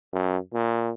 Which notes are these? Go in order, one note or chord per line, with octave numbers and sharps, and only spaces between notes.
F#2
A#2